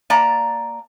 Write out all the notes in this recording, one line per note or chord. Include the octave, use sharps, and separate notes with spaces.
A#3 D5 A5 A#5